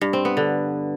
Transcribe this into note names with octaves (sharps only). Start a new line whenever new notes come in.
G2
C4
B3
D3